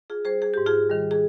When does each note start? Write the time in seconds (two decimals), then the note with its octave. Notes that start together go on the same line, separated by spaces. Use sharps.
0.10 F4 G#4
0.25 G3 G#4 C5
0.42 G#4
0.54 G#2 G4
0.66 F4 G#4
0.90 D#3 G3
1.11 G#4